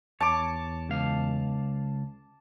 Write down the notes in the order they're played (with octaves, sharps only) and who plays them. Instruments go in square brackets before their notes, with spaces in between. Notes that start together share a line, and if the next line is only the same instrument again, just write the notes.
[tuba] E2 [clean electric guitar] C#5 [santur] A5 D6
[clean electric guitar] C#2 F5